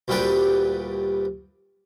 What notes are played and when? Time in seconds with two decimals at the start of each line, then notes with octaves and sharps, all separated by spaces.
0.08 D2 A#2 G3 D4 B4 G5